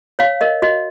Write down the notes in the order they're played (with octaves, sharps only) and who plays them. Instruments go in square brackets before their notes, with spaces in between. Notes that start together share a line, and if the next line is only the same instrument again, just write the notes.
[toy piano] C#5 F5
A#4 D#5
F#4 D#5